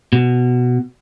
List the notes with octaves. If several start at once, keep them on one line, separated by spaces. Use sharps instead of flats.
B2